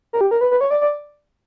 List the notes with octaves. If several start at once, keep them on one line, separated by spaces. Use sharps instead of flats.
A#4
G4
A#4
B4
B4
C#5
D5
D5